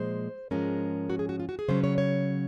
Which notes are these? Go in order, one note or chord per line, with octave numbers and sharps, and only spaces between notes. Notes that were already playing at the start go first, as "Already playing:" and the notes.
Already playing: A#2 F3 G#3 C5
G#2 F3 G#3 C#4 A#4
F#4
G#4
F#4
F4
F#4
G#4
C#3 F#3 C#4 C5
C#5
C#5